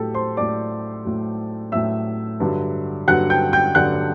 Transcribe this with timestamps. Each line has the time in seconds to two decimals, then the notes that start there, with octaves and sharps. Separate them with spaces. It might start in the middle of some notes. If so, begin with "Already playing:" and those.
Already playing: A2 F#3 G4 A4 A5
0.14 C5 C6
0.37 A2 F#3 D5 D6
1.05 A2 F#3
1.72 A2 F#3 E5 E6
2.40 G2 D3 F#3
3.08 G2 D3 F#3 F#5 F#6
3.30 G5 G6
3.53 G5 G6
3.75 G2 D3 F#3 F#5 F#6